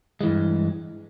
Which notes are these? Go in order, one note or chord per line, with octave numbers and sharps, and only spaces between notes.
G2 E3 G#3